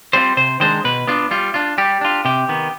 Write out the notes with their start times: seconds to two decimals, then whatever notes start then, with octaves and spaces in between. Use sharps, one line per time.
0.13 G3 C4 F4 C5
0.37 C3 C5
0.60 D#3 G#3 D4 C5
0.85 B2 B4
1.07 B3 D4 F4
1.31 G3 F4
1.54 D4 F4
1.78 G3 G4
2.01 D4 F4
2.25 C3 G4
2.49 D#3 B3